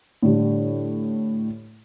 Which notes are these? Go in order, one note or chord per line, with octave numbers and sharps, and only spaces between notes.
A2 D3 G3